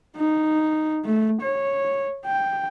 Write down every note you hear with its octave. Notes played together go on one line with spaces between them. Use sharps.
D#4
A3
C#5
G5